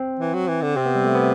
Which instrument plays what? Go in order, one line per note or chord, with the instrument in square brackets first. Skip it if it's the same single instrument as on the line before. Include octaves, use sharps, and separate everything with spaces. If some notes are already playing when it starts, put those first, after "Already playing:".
Already playing: [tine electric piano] C4
[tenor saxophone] E3
F#3
E3
D3
[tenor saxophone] C3 [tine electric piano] C4
[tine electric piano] B3
G3
A3
B3